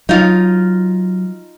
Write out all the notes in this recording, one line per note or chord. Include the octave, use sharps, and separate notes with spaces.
F#3 D#4 F4